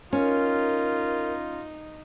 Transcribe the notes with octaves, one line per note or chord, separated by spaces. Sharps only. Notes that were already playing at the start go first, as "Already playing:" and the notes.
C#4 D#4 F4 A#4